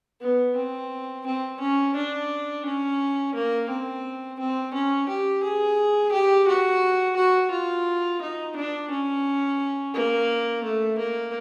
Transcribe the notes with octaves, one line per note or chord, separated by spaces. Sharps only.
B3
C4
C4
C#4
D4
C#4
A#3
C4
C4
C#4
G4
G#4
G4
F#4
F#4
F4
D#4
D4
C#4
A#3
A3
A#3